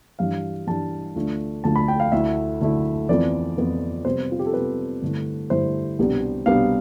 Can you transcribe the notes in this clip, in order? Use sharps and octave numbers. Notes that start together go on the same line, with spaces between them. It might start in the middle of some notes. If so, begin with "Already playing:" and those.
G2 E3 G3 D4 F5
G2 E3 G3 D4 A5
D2 D3 A3 D4 F4
D2 D3 A3 D4 F4 A5
B5
G5
F5
D2 D3 A3 E4 E5
D2 D3 A3 E4
F2 E3 B3 F4 D5
F2 E3 B3 F4
C3 G3 B3 C5
F4
G4
A4
C3 G3 B3 B4
G2 D3 A3 E4
G2 D3 A3 E4 C5
C2 B2 G3 B3 D4
C2 B2 G3 B3 D4 F5